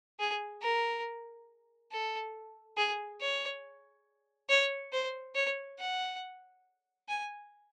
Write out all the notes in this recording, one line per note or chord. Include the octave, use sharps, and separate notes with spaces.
G#4
A#4
A4
G#4
C#5
C#5
C5
C#5
F#5
G#5